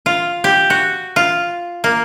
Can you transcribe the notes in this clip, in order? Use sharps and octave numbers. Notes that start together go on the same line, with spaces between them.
F4
G4
F#4
F4
A#3